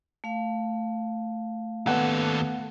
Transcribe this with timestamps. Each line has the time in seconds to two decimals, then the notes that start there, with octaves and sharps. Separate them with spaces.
0.24 A3 F5
1.87 D#2 B3 A4 F#5